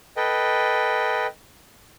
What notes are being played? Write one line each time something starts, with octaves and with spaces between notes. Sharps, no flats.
A4 B4 D#5 G5